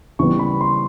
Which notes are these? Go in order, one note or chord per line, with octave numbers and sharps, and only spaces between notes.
C#3 E3 G3 B3 C#6
B5
C6